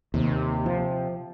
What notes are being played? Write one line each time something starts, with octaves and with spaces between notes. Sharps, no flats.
D#2 C3
F3